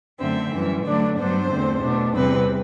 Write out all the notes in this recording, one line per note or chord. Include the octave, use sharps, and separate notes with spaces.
F#2 D3 A3 C4 E5
F#2 E3 G3
D3 F#3 A3 D4 D5
G2 F#3 B3 D4 C5
E2 D3 A3 C4
B2 A3 D4
E2 C3 G3 C4 B4